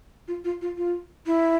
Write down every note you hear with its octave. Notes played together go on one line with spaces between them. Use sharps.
F4
F4
F4
F4
E4